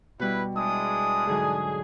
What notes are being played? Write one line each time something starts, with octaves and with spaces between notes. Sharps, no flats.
B2 G3 E4 B4
G#3 D4 E4 D#6
G#2 D3 F#3 G#4